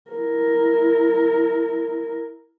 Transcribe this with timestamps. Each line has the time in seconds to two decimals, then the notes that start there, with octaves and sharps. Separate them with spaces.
0.11 E4 A#4